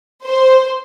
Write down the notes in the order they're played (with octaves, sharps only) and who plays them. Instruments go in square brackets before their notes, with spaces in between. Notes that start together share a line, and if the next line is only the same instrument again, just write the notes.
[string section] C5